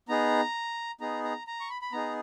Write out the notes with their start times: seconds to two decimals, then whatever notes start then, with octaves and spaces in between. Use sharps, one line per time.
0.09 B3 D#4 G#4 A#5
1.01 B3 D#4 G#4 A#5
1.24 A#5
1.47 A#5
1.60 C#6
1.70 B5
1.82 B5
1.92 B3 D#4 G#4 A#5